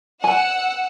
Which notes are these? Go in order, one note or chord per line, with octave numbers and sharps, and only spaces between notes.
F#5 G#5 E6